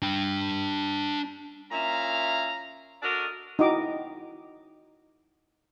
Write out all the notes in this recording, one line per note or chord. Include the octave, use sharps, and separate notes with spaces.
D4 G5
A#2 C#4 E4 E5 F5 A#5
D4 F#4 A4 A#4 D5 D#5
D#4 E4 F#4 D#5 G5 D6